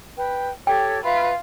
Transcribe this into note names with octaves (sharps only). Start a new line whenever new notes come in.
B4 G5
G4 A4 C#5 G5
F4 B4 E5 B5